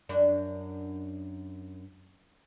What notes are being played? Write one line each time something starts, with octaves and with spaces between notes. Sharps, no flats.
F#2 D4